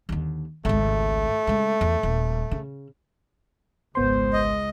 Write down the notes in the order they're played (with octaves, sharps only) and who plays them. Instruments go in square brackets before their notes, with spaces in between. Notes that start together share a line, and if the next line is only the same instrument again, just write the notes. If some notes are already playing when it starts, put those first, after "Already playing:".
[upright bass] D#2 D3
[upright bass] G#1 C#2 [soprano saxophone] A3
[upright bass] C#3 G#3
E2
D#1
C#3
[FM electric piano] G#1 B3 C6 [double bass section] C#2 G#3 [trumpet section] C5
[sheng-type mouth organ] D#5